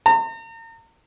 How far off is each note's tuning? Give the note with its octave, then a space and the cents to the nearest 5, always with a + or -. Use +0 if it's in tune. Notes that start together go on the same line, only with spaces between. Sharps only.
A#5 -40